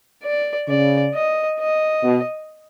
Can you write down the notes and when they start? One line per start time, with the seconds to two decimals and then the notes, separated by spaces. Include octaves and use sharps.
0.23 D5
0.68 C#3 D5
1.14 D#5
1.59 D#5
2.04 B2